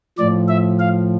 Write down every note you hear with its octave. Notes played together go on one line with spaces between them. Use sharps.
A2 F3 D5
E5
F5